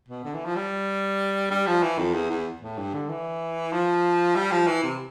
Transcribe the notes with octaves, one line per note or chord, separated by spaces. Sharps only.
B2
D3
E3
F3
G3
G3
F3
E3
F2
E2
E2
A2
G2
D3
E3
F3
G3
F3
E3
C3